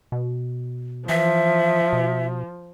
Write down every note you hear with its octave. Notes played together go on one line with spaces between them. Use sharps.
B2
E3 F3 E5
B2